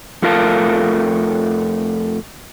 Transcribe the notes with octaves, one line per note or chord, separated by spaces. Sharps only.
F2 A3 F4 A#4 F5 A5